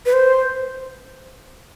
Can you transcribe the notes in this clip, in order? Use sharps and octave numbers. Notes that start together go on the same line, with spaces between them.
B4
C5